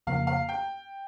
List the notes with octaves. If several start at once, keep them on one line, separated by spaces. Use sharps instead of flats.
F2 C#3 F3 A#3 F5
F5
G5